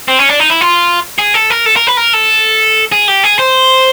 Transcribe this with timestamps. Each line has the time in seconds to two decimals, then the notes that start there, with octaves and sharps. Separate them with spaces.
0.08 C4
0.19 C#4
0.29 D4
0.40 D#4
0.50 E4
0.61 F4
1.18 G#4
1.34 A4
1.50 A#4
1.66 A4
1.76 A#4
1.87 B4
1.97 A#4
2.13 A4
2.92 G#4
3.08 G4
3.23 G#4
3.39 C5